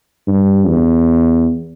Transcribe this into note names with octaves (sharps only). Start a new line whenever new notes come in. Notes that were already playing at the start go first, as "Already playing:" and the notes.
G2
E2